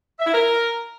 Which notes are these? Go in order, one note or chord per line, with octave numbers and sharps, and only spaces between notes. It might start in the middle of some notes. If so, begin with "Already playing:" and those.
E5
E4
A#4